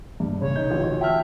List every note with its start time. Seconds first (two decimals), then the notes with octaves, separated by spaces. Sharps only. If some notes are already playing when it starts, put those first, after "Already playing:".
0.20 G2
0.42 C#3 C#5
0.56 D#4 G6
0.70 D1 A1 F4
1.01 E5 G5 A5 F6